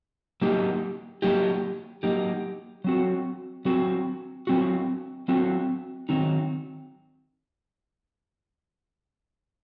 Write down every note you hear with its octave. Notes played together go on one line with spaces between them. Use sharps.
F#3 A#3 D#4 G4
F#3 A#3 D#4 G4
F#3 A#3 D#4 G4
F#3 C4 F#4
F#3 C4 F#4
F#3 C4 F#4
F#3 C4 F#4
D#3 F#3 C4 D#4